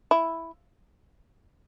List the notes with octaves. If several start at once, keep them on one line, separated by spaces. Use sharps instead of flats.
E4